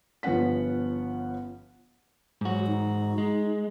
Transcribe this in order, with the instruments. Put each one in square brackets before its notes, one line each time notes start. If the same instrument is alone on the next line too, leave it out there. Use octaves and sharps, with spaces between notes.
[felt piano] G1 F3 B3 C#4 F#5 B6
[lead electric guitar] G#2 F#4 [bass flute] F#3
[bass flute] D#4
[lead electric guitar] G#3